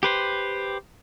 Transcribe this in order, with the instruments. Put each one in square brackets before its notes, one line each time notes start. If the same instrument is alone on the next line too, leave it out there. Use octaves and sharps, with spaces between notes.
[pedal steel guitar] G4 B4 C5